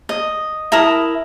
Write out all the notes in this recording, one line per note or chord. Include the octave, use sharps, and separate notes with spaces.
D#5
E4 A#4 A5 D#6